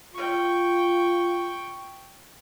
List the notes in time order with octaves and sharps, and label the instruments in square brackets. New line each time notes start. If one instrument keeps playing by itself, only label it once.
[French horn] F4 [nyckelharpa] G5 C#6